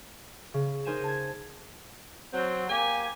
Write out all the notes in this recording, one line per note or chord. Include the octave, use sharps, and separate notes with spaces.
C#3
D#4 A#4 C5 G#5 D#7 E7
A5 G#6
F#3 C4
A#3 G4 G#5